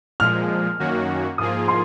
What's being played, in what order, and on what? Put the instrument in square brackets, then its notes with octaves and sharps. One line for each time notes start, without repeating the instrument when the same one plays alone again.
[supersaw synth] A#2 F3 G#3 [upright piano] F6
[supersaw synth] F#2 D#3 A#3 C#4 F#4
[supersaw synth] G#2 F3 A#3 F4 G#4 [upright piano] D#6
[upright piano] C6